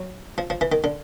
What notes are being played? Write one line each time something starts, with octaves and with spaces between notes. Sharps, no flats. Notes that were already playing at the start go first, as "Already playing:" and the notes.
Already playing: F#3
F3
F3
E3
D#3
D3